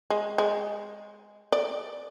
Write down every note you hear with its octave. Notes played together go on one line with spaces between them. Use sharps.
G#3
G#3
D5